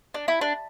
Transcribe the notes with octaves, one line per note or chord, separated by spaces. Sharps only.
D4
E4
D4